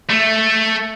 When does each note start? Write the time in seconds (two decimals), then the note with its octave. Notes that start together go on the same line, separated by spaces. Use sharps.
0.10 A3